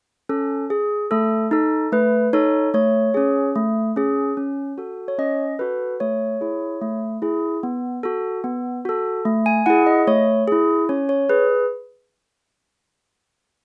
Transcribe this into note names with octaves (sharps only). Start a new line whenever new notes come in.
C#4 A4
G#4
A3 A4
D#4 A4
A3 B4
D#4 A4 C#5
A3 C#5
C#4 G#4
A3
C#4 G#4
C#4
F#4 A4
C#5
C#4 D#5
F#4 A4 B4
A3 C#5
E4 G#4
A3
E4 G#4
B3
F#4 A4
B3
F#4 A4
A3
G#5
E4 G#4 F#5
D#5
A3 C#5
E4 G#4
C#4 C#5
C#5
G#4 B4